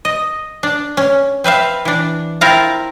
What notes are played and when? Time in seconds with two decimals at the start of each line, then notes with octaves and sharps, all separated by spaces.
0.05 D#5
0.63 D4
0.97 C#4
1.44 C4 B4 E5 F5
1.85 E3 D4
2.41 C4 E4 F4 A#4 F5 A#5